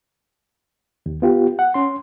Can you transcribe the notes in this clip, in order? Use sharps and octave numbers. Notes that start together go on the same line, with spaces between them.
D#2
B3 F4 G4
F#5
C#4 C6